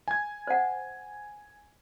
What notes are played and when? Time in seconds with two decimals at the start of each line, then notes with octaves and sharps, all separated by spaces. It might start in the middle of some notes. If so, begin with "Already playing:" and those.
0.08 G#5 G#6
0.47 C5 F#5